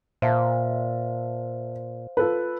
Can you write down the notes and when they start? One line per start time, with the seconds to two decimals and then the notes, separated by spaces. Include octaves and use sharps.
0.22 A#2 C5 E5 F5 A5
2.17 F4 A4 B4